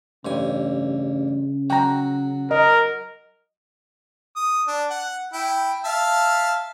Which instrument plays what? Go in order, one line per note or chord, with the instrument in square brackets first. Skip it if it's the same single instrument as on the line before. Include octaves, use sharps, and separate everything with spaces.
[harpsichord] A1 G2 G#5 [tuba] C#3
[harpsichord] F#3 F#4 [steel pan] G5 A#5
[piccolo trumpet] A#4 [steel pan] D#5
[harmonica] D#6
D4
F#5
E4 G5
E5 F5 A5